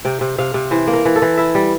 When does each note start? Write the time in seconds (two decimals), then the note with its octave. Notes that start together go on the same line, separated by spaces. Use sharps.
0.05 C3 G5
0.21 C3
0.38 C3 F5
0.54 C3
0.71 E3 C5
0.88 A#3
0.93 A#4
1.05 E3
1.16 A4
1.22 E3
1.37 E4 E5
1.55 G3